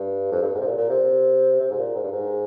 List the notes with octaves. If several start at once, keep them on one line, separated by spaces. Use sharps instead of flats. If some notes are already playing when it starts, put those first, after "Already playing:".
Already playing: G2
F2
G2
G#2
C3
A#2
A#2
C3
C3
G#2
A#2
G#2
G2
G#2